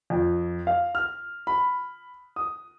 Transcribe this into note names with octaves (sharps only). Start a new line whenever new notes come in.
F2
F5
F6
B5
D#6